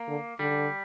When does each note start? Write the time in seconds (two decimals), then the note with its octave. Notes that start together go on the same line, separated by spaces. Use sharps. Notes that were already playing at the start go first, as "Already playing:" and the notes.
Already playing: A#3
0.08 D3
0.39 D3 G3